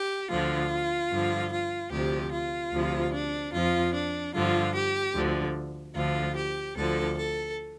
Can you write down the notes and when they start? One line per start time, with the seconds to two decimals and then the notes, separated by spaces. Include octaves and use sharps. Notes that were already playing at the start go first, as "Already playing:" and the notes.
Already playing: G4
0.29 D2 D3 F3 F4
1.10 G2 D3 F3
1.51 F4
1.91 D2 C3 F3 G4
2.32 F4
2.72 D2 C3 F3
3.12 D4
3.53 F2 F3 F4
3.94 D4
4.34 G2 D3 F3 F4
4.74 G4
5.14 D2 D3 F3
5.95 D2 D3 F3 F4
6.36 G4
6.76 D2 D3 F3 A4
7.17 A4